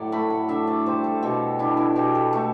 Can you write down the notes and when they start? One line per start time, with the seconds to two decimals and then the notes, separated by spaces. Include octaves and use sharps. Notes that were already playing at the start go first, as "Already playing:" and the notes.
Already playing: A2 F#3 D5 E5 F#5
0.12 A3 B5
0.30 F#5
0.48 D4 E5
0.67 D5
0.86 G3 C5
1.04 A4
1.23 B2 G4
1.59 D4 E4
1.77 E4
1.96 B2 G4
2.15 A4
2.33 A3